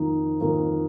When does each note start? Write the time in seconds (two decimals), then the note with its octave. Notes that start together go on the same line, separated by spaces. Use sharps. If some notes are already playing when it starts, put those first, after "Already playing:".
Already playing: F2 D#3 A#3 D#4
0.41 F2 D#3 A#3 D#4